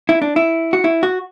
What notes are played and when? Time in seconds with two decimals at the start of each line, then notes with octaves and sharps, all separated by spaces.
0.09 E4
0.22 D4
0.36 E4
0.73 F#4
0.84 E4
1.03 F#4